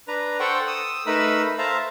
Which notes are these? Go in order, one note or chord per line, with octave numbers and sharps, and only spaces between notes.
D4 B4 A#5
A4 C5 F#5 G5 C#6
D#6 E6
A3 D#4 A#4 B4 B5 E6
C5 E5 F5 A5 A#5